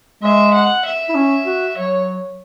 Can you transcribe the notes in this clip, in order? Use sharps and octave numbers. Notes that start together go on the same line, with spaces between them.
G#3 E5
F#5
E5
E4
C#4
F#4
F#3 C#5